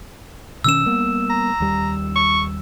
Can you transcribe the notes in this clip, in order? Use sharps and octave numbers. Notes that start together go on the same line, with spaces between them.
B2 D#3 C#4 E6 E7
G3 A#3 B3
A#5
D#2 G3
C#6